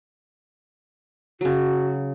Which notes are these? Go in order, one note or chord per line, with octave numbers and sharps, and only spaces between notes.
C#3 F#3 F#4